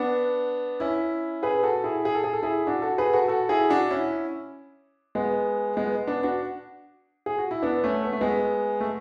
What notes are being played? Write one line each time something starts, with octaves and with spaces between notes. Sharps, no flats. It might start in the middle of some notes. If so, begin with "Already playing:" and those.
Already playing: B3 D4
C#4 E4
G#4 B4
F#4 A4
E4 G#4
G#4
A4
G#4
A4
E4 G#4
D4 F#4
F#4 A4
G#4 B4
F#4 A4
F#4 A4
E4 G#4
D4 F#4
C#4 E4
G#3 B3
G#3 B3
B3 D4
D4 F#4
G#4
F#4
E4
B3 D4
A3 C#4
B3
A3
G#3 B3
A3